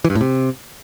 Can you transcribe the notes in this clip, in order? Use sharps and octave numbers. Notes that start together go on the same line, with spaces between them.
E3
G2
A2
C3